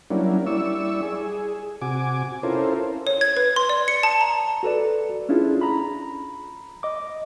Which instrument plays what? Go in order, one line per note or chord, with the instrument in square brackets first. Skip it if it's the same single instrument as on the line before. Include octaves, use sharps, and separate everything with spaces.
[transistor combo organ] F#3 G3 A#3 C#4 D4 E4
G3 E4 D5 C#6 E6
G#4
C3 F#4 G#5 D6
C#4 E4 F4 A4 A#4 C5
[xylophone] C#5
G#6
B4
C6
D5
C#7
A5
A#5
[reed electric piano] F#4 A4 B4 D5
C#4 D4 E4 F4 G#4
A#5 B5
D#5 D6